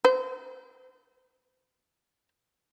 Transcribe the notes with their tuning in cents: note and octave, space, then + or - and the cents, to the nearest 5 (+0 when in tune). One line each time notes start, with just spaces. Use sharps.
C5 -30